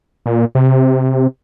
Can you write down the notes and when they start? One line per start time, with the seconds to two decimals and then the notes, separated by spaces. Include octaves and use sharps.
0.26 A#2
0.55 C3